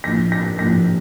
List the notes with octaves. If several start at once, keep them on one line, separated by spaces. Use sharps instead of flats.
A#1 A2 F3 A#6
A#6
A#1 A2 F3 A#6